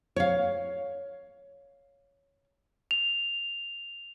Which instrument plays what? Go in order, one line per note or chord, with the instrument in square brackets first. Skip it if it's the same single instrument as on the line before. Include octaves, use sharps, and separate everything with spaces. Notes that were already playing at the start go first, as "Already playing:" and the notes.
[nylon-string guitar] C#5 F5
[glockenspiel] F7